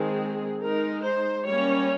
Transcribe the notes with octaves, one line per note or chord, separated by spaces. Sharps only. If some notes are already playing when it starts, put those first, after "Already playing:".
Already playing: D#3 G#3 C4 G#4
G#3 D#4 A#4
C5
G3 A#3 C#4 C#5